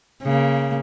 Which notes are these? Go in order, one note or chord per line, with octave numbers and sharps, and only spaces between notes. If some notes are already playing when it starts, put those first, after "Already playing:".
C#3 A#3